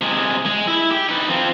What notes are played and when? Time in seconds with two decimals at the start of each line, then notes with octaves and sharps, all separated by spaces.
0.01 C3 G#3
0.46 G#3
0.67 E4
0.91 G4
1.09 D#4 B4
1.29 F3 C4